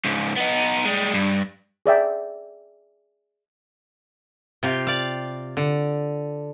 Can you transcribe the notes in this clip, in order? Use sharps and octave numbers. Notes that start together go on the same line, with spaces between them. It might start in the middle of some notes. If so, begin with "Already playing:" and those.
C#2 G#2
B3 D#4
G3 G#3
G2
G#4 D5 E5 G5
C3 F4 G4
D5 F5
D3